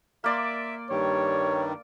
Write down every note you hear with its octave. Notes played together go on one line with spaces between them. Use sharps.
A#3 D5 E5 C6
G2 D#3 G3 C#5